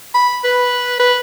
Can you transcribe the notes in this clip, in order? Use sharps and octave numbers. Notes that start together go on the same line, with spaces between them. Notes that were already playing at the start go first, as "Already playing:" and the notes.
B5
B4
B4